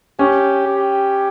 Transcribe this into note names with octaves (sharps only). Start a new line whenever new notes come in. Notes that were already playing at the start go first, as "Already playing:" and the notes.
C#4 G4
G4